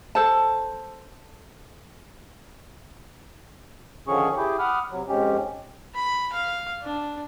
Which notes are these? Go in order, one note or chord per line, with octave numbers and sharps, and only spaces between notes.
A4 C5 A5
D3 D#3 F3 C#4 G#4 C#6
E4 G4 G#4 G5 D6
F#5 B5 D6 D#6 F6
C3 F#3
F2 G#2 G#3 C#4 G4
B5
F5
D4